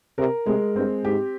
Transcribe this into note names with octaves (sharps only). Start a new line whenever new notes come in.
C3 A#4
C3 G#3
G2 C4
G#2 G4